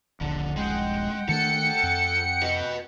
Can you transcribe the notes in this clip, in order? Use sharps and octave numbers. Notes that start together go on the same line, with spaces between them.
D#1 A#1 D3
G#3 F#5 G5
D#3 A3 D4 A4 C#7
F2
B4 D#5